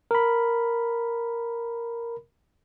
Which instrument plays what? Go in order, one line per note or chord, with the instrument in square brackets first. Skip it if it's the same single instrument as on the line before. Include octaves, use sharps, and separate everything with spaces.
[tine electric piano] A#4 B5